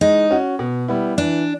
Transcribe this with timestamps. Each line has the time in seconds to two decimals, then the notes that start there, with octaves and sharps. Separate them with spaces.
0.01 G#3 D#4
0.31 C#4 F#4
0.59 B2
0.88 G3 B3 E4
1.17 E3 D4